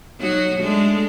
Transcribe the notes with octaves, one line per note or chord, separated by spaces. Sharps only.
F#3 D#4 F#4
G#3 A3 D4